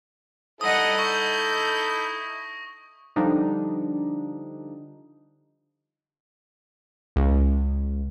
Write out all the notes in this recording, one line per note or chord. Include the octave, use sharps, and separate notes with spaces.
G3 D#4 E4 A4 D#5 F#5 D#6 A#6
C#6 G6
D3 F3 G3 D4 D#4
C#2